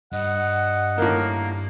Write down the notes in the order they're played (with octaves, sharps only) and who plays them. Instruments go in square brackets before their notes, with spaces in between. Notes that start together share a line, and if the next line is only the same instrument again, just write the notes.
[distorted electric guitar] G2 [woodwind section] D#5 F#5
[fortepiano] A2 D#3 [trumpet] A#3